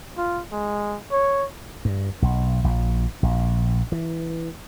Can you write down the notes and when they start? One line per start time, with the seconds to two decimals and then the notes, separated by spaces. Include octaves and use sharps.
0.18 F4
0.52 G#3
1.12 C#5
1.85 G2
2.22 B1
2.64 A#1
3.23 A#1
3.92 E3